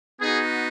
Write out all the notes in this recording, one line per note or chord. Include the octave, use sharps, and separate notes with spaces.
B3 D#4 F#4 G#4